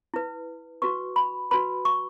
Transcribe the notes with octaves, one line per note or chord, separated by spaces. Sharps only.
E4 B4
F#4 B4 C#6
B5
F#4 B4 B5
C#6